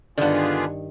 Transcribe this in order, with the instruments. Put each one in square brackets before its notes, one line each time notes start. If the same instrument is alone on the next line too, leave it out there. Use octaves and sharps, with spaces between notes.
[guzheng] G2 D#3 [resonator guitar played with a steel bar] D3 B3 [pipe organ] D4 F4 G#4 [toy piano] D5